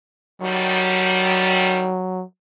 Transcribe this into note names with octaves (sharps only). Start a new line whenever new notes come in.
D3 D#3 F#3 G3